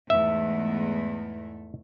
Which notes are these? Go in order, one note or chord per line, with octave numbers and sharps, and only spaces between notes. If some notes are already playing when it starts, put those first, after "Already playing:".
E2 G#2 A3 E5